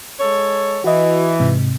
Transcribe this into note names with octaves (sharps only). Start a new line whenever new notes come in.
G#3 A4 C#5
E3 F#4 D#5
G#2 C3